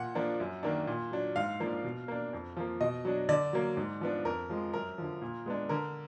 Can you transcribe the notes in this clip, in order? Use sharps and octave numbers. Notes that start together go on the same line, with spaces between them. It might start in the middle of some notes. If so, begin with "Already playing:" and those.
Already playing: A#2 F#5
F3 A#3 D4
F#2
D#3 A#3 D4
A#2
F#3 D4
G#2 F5
F3 A#3 D4
B2
A#3 D4
F2
F3 A#3
B2 D#5
F#3 D4
D3 D5
F#3 A#3
G#2
F3 B3 D4
F2 A#4
F3 G#3
F#2 A#4
D3 F3
A#2
G#3 B3 D4
D3 A#4